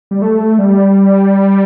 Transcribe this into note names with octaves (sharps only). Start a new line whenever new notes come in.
G3
A3
G3